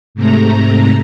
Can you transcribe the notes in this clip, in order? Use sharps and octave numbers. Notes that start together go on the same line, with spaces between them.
G#2 C3 A3 A#5